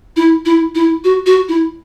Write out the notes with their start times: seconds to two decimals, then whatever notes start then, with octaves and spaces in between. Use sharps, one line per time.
0.16 E4
0.46 E4
0.75 E4
1.04 F#4
1.26 F#4
1.49 E4